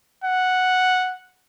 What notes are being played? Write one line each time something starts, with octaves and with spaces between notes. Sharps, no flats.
F#5